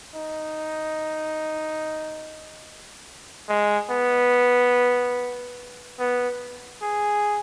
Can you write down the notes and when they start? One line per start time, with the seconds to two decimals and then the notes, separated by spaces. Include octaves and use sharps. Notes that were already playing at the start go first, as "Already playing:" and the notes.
0.15 D#4
3.49 G#3
3.90 B3
5.99 B3
6.82 G#4